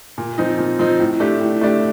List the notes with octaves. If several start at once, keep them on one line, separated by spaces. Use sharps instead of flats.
A#2
F3 C4 D#4
A#2
F3 C4 D#4
A2
A3 D4 G4
A2
A3 D4 G4